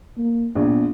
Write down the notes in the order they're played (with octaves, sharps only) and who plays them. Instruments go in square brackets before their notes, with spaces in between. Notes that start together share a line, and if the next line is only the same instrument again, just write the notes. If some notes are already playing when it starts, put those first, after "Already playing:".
[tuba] A#3
[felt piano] A#1 [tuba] B3